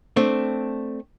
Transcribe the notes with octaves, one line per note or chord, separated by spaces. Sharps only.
A3 C4 D4